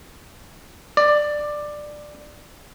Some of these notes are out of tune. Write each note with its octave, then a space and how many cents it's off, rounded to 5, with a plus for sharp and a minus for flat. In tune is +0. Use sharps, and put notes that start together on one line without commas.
D5 +15